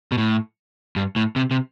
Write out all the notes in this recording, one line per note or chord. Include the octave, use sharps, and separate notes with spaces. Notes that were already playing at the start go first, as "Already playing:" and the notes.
B2
A2
G2
A2
C3
C3